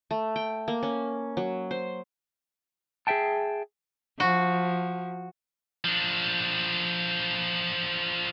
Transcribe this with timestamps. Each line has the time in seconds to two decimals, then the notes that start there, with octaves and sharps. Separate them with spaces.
0.11 A3
0.36 G5
0.68 A#3
0.83 C#4
1.37 F#3
1.71 C5
3.07 G#4 A#4 E5 G5 A5
4.20 F3 F#4
5.84 F3 D4